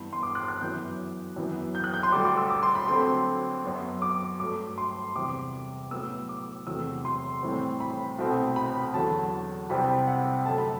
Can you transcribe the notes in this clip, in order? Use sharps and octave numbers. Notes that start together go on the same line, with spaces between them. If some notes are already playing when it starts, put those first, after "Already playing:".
Already playing: G2 E3 B3
C6
D6
F#6
F#6
F#2 E3 B3 G6
F#2 E3 B3
G6
F#6
G6
C6
D2 D3 G3 D6
D6
E6
D6
C6
B5
D2 D3 F#3 C4 C6
F#2 F#3 B3
D6
G2 F#3 A3 D6
C6
E2 C3 G3 D6
A2 F#3 B3 E6
D6
E2 C3 F#3 A3 E6
C6
A2 E3 G3 C4
B5
C2 B2 A3 C4
B5
E2 D3 F#3 A5
C2 C3 G3 C4 B5
F#5
F#2 D3 A3 A5
B5